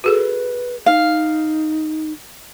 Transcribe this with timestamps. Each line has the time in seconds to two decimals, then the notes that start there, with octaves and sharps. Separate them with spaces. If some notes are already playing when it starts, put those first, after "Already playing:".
0.04 F#4 G#4 A4 B4
0.86 D#4 F5